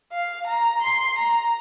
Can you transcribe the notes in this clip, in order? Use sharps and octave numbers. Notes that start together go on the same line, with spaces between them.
F5
A#5
C6
A#5